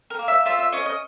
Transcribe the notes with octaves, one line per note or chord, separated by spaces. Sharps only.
A#4
A#3
E5
F4 E5
E5
C#4 D#5
D#5